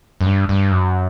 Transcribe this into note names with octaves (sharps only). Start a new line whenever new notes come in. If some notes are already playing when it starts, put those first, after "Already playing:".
F#2
G2
G2
F#2